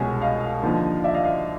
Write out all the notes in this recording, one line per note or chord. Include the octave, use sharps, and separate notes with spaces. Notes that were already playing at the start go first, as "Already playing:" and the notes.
Already playing: C2 B2 G#3 C#4
D#5 F5
D#2 D3 F3 A#3 D#4
D5 E5
D#5 F5
D#5 F5